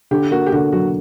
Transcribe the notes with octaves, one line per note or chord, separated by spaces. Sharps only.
D3 G4
A#3 F#4
G4
D3 F#4
F#3 F#4